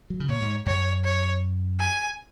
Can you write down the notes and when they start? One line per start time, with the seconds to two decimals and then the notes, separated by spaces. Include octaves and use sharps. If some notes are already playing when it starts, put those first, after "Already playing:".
0.10 F#3
0.20 C#3
0.29 A#2 C#5
0.42 G#2
0.66 F#2 C#5
1.04 C#5
1.79 G#5